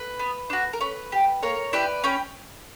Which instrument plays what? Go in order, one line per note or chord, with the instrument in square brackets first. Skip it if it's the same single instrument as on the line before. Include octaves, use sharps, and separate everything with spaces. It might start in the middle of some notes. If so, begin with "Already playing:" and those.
Already playing: [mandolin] B4
B3
D4 F#4
A#4
C#4 B4
G4
A#3 A#4 C#5
E4 G4 B4 D5
C#4 G5 B5